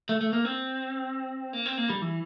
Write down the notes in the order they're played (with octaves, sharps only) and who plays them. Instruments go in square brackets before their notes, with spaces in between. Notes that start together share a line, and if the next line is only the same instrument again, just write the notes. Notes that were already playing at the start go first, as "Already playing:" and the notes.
[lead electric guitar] A3
A3
A#3
C4
A#3
C4
A#3
G3
E3